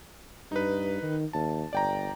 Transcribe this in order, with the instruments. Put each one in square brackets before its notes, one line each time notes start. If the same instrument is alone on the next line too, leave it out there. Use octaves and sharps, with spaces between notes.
[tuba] G2 [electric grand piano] D#4 B4
[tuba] D#3
[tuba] D#2 [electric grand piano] A5
[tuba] G1 [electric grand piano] D5 G5 A#5